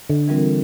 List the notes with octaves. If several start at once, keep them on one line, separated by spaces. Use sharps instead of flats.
D3
E3 G3 C4 F4 A#4